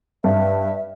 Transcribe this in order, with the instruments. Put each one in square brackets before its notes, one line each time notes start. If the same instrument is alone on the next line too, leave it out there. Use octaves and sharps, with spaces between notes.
[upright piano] G2 [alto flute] E5